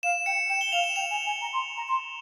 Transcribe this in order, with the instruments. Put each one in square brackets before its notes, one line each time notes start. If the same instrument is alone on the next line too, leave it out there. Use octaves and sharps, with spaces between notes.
[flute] F5 [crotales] E7
[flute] G5 [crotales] C#7
[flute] G5 [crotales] E7
[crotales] G7
[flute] F5 [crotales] F7
[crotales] E7
[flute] G5 [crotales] F7
[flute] G#5
G#5
A#5
C6
A#5
C6